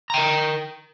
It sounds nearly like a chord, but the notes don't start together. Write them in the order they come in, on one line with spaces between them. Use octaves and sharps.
A#5 G5 A#4